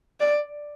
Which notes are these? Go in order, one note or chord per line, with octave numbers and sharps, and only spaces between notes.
D5